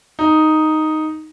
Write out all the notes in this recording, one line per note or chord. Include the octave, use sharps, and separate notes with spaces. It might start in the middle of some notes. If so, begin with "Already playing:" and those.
D#4